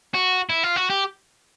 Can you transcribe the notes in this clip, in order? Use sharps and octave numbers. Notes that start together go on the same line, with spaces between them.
F#4
E4
F4
F#4
G4